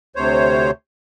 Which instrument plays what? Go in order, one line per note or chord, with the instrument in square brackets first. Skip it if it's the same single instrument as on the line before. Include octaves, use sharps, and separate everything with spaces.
[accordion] D2 C3 C5 C#5